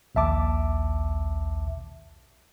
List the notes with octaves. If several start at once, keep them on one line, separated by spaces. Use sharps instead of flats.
A#1 D#2 E5 A5 D6